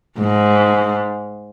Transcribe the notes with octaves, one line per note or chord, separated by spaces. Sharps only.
G#2